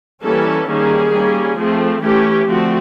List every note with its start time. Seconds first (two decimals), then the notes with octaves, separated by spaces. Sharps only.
0.23 E3 G3 A#3 C#4 A4
0.68 D#3 G3 A#3 C#4 G#4
1.13 G3 A#3 C#4
1.58 F3 A3 C4
2.02 E3 A3 C#4 G4
2.48 D3 F3 A3 C4 F#4